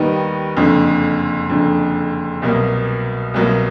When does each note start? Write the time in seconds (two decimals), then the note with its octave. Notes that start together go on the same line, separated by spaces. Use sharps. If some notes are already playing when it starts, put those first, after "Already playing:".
Already playing: D#2 D#3 G3 B3 D#4
0.57 F#1 F2 D3
1.49 F#1 F2 D3
2.42 C2 B2 F#3 A#3
3.34 C2 B2 F#3 A#3